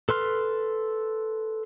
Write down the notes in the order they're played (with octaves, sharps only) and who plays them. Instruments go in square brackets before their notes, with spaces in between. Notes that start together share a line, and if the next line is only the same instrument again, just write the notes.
[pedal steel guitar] A4 B4 C6 F6